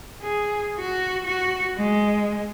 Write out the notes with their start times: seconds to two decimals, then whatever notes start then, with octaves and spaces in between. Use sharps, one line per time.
0.21 G#4
0.79 F#4
1.26 F#4
1.77 G#3